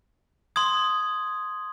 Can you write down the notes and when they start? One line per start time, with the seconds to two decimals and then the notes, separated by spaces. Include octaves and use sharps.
0.56 C6 D#6 G#6